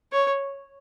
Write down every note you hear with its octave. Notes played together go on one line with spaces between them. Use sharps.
C#5